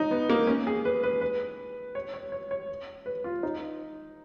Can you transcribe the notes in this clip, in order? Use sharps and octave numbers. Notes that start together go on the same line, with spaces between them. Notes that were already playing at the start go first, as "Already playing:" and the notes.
Already playing: D#4
B3
A#3
C#4
G#4
B4
B4
B4
C#5
C#5
C#5
C#5
B4
F4
D#4